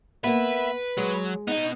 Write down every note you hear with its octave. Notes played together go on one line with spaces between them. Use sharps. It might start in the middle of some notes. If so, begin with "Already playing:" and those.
A#3 B3 B4 E5
F#3 G#3
B3 D#4 D#5